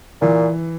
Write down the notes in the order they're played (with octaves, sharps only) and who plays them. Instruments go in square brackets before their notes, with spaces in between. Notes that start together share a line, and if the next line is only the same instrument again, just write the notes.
[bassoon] A#2 [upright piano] E3